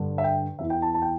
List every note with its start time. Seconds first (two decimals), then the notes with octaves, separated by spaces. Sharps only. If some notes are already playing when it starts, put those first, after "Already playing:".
Already playing: G2 D3
0.18 E5
0.24 G5
0.59 E2 E3 E5
0.70 G5
0.82 A5
0.94 A5
1.02 G5